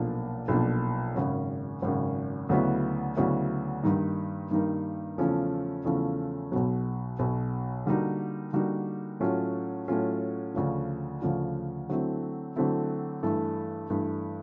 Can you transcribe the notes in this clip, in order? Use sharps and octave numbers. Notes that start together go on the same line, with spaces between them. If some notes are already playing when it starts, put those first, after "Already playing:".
Already playing: B1 A#2 F3 A#3 D4
B1 A#2 F3 A#3 D4
G#1 F#2 C#3
G#1 F#2 C#3
D2 C#3 F#3 B3 E4
D2 C#3 F#3 B3 E4
G2 D#3 G3 A#3 D#4
G2 D#3 G3 A#3 D#4
E2 C#3 F3 A3 C#4
E2 C#3 F3 A3 C#4
B1 B2 F#3
B1 B2 F#3
D3 G3 A#3 D#4 F#4
D3 G3 A#3 D#4 F#4
A2 F#3 A3 C#4 F4
A2 F#3 A3 C#4 F4
D2 C#3 F3
D2 C#3 F3
D3 F#3 A3 C4 E4
D3 F#3 A3 C4 E4
G2 E3 A3
G2 E3 A3